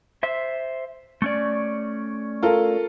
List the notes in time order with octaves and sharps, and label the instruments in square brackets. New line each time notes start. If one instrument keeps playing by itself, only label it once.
[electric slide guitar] C5 E5
A3 C#4 D5
[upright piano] F4 A4 A#4